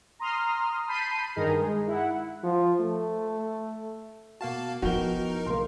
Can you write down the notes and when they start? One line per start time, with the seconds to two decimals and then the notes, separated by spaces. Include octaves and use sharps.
0.20 A#5 C6 D#6 F6
0.88 A5 B5 G6 B6 C7 D#7
1.35 G2 D#3 D#4 G#4 A#4 A#5
1.58 G#3
1.87 E4 F#5
2.43 F3
2.80 A3
4.41 B2 A#3 F#4 F5 A5
4.82 F3 B3 D#4 E4 F#4 A#4 G5 G7
5.46 B1 C#3 A#3 C6